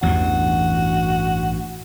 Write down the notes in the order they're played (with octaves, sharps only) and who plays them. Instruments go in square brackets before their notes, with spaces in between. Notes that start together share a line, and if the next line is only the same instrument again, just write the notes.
[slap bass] A1 G2 [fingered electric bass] E2 [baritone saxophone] F#4